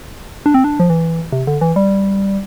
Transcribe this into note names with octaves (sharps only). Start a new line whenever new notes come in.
D4
C4
D4
F3
E3
C3
D3
E3
G3